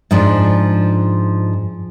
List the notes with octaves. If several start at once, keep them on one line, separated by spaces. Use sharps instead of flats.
G#2 F3 D4